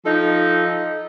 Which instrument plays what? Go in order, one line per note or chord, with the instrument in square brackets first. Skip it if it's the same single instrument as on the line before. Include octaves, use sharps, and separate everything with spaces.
[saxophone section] F3 D#4 A4